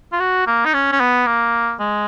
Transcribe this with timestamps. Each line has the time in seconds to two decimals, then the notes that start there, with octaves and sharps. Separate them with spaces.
0.12 F4
0.20 F#4
0.47 A#3
0.65 D#4
0.74 C#4
0.92 C#4
1.00 B3
1.27 A#3
1.80 G#3